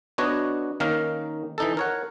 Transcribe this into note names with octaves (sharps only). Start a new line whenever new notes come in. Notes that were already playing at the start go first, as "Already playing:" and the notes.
B3 D4 F#4 C#5 D#5
D#3 A#3 C#4 D#4 A#4 F5
E3 D#4 A4
A#4 C#5 F#5